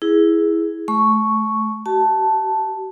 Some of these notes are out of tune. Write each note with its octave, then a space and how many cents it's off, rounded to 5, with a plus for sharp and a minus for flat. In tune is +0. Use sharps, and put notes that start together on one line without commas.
E4 +0 G#4 +0
A3 -25 C#6 +0
F#4 +45 A5 +0